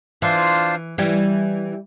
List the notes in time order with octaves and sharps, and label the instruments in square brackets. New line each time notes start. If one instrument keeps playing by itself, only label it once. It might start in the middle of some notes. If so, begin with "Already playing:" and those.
[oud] E3 [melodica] D4 F4 C5 F5
[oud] E3 G3